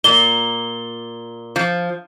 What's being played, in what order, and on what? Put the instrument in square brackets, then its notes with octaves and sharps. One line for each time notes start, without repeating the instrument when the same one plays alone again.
[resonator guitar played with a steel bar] A#2 [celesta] G7
[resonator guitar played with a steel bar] F3